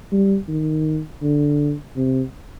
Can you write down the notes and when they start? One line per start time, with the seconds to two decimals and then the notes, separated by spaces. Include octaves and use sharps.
0.12 G3
0.48 D#3
1.22 D3
1.96 C3